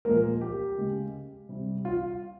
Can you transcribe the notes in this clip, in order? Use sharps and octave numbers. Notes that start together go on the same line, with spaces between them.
A#2 F3 G#3 A#3 A#4
G4
C#3 G#3
C3 G3
F4